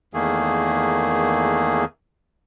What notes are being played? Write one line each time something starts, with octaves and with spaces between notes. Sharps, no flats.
E2 D#3 A3 A#3 G#4